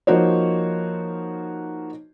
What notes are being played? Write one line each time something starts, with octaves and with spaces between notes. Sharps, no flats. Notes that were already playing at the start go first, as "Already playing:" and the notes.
F3 A#3 D#4 F#4 C5 C#5